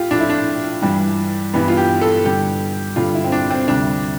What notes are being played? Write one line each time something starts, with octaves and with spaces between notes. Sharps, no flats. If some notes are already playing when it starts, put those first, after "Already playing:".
Already playing: A2 F4 G4
A2 F3 D4
E4
D4
G2 E3 G3
G2 E3 G3 B3
F4
G4
A4
G2 D3 G3 G4
G2 D3 G3 F4
E4
C4
D4
C4
D2 C3 G3 D4